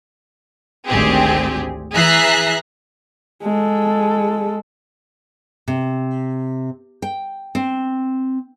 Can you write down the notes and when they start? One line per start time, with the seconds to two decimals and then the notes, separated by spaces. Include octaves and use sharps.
0.86 G#1 D2 C4 G4 G#4
1.93 E3 G#4 E5 A#5 F#6 C7
3.43 G#3 A4
5.68 C3
7.02 G5
7.55 C4